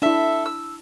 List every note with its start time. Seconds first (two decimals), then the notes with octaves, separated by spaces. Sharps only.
0.02 D4 E4 A4 E5
0.46 E6